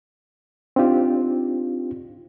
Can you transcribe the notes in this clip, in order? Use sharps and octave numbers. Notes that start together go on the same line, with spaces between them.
C4 D4 D#4 F4 G4